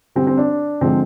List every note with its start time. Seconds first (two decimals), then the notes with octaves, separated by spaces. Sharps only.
0.15 D3 G3 C4
0.27 C4
0.38 D4
0.81 D3 F3 G#3 C4